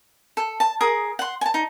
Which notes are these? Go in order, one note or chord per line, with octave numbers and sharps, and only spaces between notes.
A4
A5
G#4 A#4 D#6
F#5 C6
G#5 A5
D#4